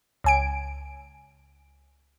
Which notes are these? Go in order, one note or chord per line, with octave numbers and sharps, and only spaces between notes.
C#2 G#5 D7